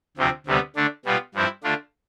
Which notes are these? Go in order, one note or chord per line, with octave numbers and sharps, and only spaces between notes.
D2 C3 F3 C4
D2 C3 G3 B3
D3 A3 D4
B2 G3 B3 F4
G2 F3 C4 E4
D3 A3 D4 F4